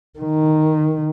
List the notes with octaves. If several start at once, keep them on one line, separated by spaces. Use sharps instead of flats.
D#3